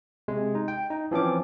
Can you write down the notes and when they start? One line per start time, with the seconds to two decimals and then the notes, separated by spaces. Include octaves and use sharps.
0.28 C3 G#3
0.55 D#4
0.68 G5
0.90 D#4
1.11 E3 F3 C4 C#4 D6